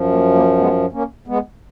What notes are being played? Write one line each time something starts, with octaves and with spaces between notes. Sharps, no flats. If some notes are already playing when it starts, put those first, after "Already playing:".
Already playing: F#2 F3
A#3
A#3
G#3 B3
A#3 C#4
G#3 B3